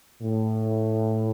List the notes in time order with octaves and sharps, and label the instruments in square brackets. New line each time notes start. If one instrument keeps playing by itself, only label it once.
[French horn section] A2